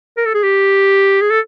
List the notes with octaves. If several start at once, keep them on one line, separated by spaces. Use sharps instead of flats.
A#4
A4
G#4
G4
G#4
A4